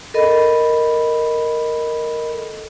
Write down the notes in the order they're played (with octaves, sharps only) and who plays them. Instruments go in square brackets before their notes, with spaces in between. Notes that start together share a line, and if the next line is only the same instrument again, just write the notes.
[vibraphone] A4 A#4 D#5 B5